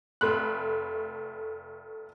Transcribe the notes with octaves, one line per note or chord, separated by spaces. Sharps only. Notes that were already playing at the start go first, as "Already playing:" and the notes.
F1 A3 B5 F#6